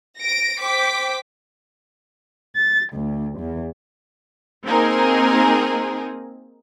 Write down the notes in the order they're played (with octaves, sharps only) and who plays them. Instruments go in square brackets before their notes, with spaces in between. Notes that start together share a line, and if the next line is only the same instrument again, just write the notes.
[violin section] A#6 D7
C5 G5 D6 B6
[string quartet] A6
D2
E2
[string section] A#3 C4 D#4 G#4 A#4